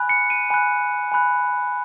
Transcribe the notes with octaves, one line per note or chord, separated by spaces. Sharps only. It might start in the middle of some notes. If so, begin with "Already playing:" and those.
Already playing: G#5 B5 F#6
C#7
D#7
G#5 B5 F#6
G#5 B5 F#6